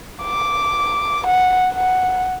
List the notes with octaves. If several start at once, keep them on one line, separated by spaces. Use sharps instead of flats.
D6
F#5
F#5